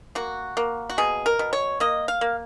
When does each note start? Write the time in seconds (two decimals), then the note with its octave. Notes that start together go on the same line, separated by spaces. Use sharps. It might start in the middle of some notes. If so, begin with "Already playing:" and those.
0.15 A#3 F#4
0.57 A#3
0.90 F#4
0.98 B2 G#4
1.26 A#4
1.39 B2
1.53 C#5
1.80 A#3 D#5
2.08 F5
2.21 A#3